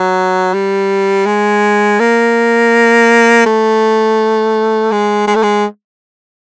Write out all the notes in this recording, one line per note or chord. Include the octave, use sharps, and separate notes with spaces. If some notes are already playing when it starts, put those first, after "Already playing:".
Already playing: F#3
G3
G#3
A#3
A3
G#3
G#3
A3
G#3